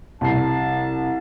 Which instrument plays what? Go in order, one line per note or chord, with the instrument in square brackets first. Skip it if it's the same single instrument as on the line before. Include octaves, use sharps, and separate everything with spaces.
[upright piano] C2 C7 [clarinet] A5